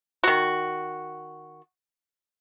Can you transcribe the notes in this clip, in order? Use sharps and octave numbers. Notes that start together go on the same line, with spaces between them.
D#3 F#4